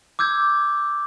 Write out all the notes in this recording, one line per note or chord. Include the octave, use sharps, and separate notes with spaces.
D6 E6 G6 G#6